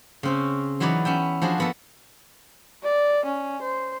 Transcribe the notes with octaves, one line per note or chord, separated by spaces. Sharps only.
C#3 C4 C#4
E3 F#3 D#4 B4 C#5 D5
B3 C#4 E5 G5
F3 D4 F#4 G#4
A#3 B3 A4
D5
C#4
C5